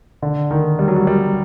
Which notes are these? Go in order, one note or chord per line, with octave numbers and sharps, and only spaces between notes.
D3
D#3
G3
F#3
G3
G3